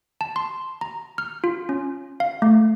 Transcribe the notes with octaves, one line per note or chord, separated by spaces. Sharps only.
A5
C6
A#5
F6
F4
C#4
F5
A3